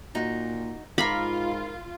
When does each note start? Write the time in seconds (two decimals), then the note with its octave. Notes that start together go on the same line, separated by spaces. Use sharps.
0.15 A#2 D#4 F#4
0.98 G#2 F4 A#4 F5 B5 D6